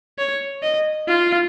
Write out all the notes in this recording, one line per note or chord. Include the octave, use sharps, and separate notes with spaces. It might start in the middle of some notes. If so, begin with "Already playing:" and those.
C#5
D#5
F4